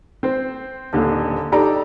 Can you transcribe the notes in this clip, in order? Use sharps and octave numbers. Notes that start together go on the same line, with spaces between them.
C4 C5
D#1 D#2 D3
D4 D#4 G4 A4 D5 A#5